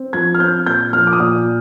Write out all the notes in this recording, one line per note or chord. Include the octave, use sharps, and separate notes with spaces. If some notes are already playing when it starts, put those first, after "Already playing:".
Already playing: C4
F3 G#6
F6
C4 G6
A#2 G6
F3 F6
D6
D#6
A#2